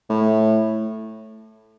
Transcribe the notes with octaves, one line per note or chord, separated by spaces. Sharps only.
A2